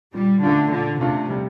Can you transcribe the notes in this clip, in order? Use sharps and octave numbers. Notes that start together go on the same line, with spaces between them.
A#2 G3
D3 A3 D4 F4
A#2 D3
C3 A3 D4 F4
G3